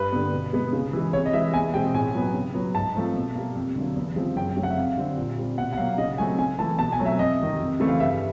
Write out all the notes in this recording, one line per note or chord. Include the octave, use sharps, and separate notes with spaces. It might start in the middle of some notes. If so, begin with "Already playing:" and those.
Already playing: G2 B4
D3 G3 B3
B2
G#3 B3
C#3
E3 G#3
C3 C#5
D#5
E3 G#3 E5
E2 G#5
B2 G#3 C4 G5
A2 G#5
F#3 B3
C#3
F#3 B3
G#2 A5
F3 A3 C4
B2
G3 A#3
F2
D3 F#3 A#3
E2
C#3 F3 G#3 C4
F#2 G5
G5
C#3 F#3 A3 C4
F#5
E5
F2 F5
D3 G3 C4
A#2
G3 C4
B2 F#5
F#5
F#3 A#3 F5
C#3 D#5
F#3 A3 C4 G#5
C#3 G#5
E3 A3 A5
B2 A5
G#5
F#3 A3 C4
E5
F2 D#5
C3 D#3
F2
C#3 E3 A3 C4
F5
G2 E5